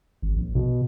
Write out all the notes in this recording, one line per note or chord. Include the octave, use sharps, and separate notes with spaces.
G#1
A#1
B2